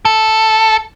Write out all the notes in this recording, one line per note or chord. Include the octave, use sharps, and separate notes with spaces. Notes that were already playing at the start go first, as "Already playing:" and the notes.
A4